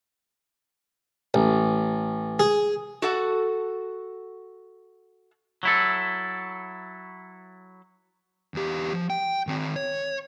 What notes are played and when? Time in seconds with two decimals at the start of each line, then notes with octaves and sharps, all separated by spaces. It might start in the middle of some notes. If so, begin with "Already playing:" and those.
1.34 A1
2.39 G#4
3.02 F#4 A4 F#5
5.63 F#3 E4 A4
8.54 E2 G4
8.93 F3
9.10 G5
9.47 D#3 C4
9.76 C#5